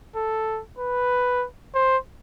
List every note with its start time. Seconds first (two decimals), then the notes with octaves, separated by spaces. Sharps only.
0.15 A4
0.78 B4
1.75 C5